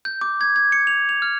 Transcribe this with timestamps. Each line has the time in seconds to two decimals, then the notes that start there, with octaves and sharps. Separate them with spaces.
0.05 G6
0.21 D6
0.41 G#6
0.56 G#6
0.72 C#7
0.87 F7
1.09 F7
1.22 F6